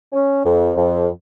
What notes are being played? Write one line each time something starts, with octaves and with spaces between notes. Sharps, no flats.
C#4
F2
F2